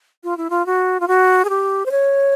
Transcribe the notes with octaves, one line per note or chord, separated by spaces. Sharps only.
F4
E4
F4
F#4
F4
F#4
G#4
G4
C5
C#5